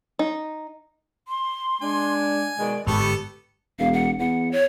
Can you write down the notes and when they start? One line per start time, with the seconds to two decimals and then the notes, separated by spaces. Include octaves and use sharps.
0.19 D#4
1.28 C6
1.82 G#3 D4 G#5
2.58 B2 D#3 G#3 D5
2.87 G1 G#2 G3 B3 G4 A4 C#6
3.79 E1 F5
3.93 F#5
4.19 E2 F#5
4.52 C#5